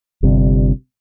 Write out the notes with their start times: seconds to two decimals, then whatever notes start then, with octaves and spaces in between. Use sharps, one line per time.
0.23 G1 G2 C3